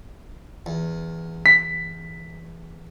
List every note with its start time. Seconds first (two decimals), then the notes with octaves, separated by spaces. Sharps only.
0.66 E2
1.46 B6